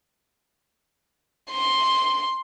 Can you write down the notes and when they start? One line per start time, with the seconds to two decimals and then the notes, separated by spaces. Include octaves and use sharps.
1.51 C6